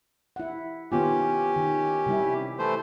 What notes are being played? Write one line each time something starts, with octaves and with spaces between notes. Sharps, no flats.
E4 F#5
D#3 B3 C#4 F4 G4
D#3
C3 G3 E4
E3 A3 C5